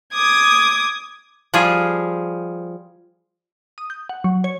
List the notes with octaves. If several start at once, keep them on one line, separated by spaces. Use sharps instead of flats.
D6 D#6 G#6
F3 G3 F4 G#4
D#6
G6
F#5
F#3
C#5